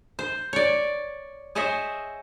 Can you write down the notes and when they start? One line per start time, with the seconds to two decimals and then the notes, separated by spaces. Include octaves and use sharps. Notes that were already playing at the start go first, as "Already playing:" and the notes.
0.19 C5
0.53 C#5 D5
1.55 G#4 C5 C#5 D#5 E5